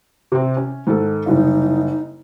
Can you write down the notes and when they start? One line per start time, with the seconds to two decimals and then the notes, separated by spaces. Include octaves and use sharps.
0.32 C3 C4
0.57 C#4
0.87 G#2 D#3 A4
1.26 F#1 C2 D#4